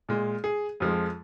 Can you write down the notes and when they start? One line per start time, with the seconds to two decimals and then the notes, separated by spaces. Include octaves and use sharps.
0.09 A#2 G#3
0.44 G#4
0.80 F2 F3 G#3